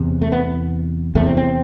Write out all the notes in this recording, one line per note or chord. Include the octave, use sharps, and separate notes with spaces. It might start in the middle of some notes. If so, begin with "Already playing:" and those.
Already playing: E2 C3
A3
B3
E2 C3 A3
C4
C4